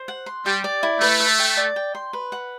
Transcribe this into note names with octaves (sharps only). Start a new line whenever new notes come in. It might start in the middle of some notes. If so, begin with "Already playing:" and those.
Already playing: C5
F#5
C6
G3 G4
D5
E4
A3 B4
E5
G5
D5
G5
C6
B4
F#5